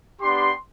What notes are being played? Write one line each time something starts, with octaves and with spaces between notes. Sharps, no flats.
B3 D4 G4 C6